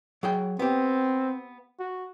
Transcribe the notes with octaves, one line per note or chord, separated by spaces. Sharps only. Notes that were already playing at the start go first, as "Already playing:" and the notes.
F#3 G#4 G5
B3 C4 G4
F#4